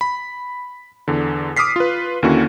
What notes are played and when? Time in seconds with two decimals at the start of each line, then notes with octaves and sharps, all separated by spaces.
0.01 B5
1.08 E2 D3
1.57 D6 D#6 F6 B6 C7
1.76 F4 B4
2.23 D#2 D3 A#3 C#4 E4 F#4